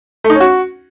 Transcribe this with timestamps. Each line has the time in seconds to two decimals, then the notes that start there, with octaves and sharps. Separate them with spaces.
0.24 A3
0.30 D#4
0.35 C#4
0.40 F#4